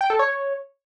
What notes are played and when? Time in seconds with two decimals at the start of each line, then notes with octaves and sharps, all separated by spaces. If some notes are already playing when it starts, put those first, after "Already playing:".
0.01 G5
0.10 A4
0.19 C#5